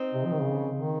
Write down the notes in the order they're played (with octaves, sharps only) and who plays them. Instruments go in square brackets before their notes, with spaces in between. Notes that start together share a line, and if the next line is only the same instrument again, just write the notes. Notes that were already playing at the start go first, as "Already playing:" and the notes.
Already playing: [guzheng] C4 D#4
[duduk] C3
F3
D#3
C#3
D#3